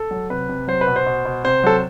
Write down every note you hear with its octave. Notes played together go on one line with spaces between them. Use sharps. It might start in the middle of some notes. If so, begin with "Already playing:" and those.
Already playing: A4
F#3
C3 B4
C3
F#3 C5
B4
B2
C5
B2
B2
C3 C5
F#3 A4